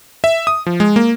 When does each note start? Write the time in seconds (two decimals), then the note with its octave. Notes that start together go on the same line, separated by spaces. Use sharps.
0.24 E5
0.47 D#6
0.66 F3
0.80 G#3
0.96 A#3